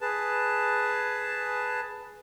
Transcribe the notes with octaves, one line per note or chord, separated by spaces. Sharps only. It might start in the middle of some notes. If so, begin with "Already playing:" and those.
G#4 B4 A5